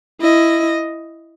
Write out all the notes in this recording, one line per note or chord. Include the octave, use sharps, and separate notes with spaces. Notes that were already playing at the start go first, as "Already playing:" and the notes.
E4 D#5